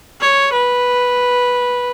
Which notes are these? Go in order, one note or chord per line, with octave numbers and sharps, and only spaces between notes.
C#5
B4